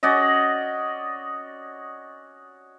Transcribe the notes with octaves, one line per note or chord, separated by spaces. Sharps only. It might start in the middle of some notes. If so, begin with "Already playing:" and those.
C#4 F#4 D5 D#5